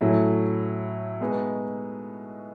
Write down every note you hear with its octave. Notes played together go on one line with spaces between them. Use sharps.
A2 F#3 A3 C#4 E4
B2 G#3 B3 D#4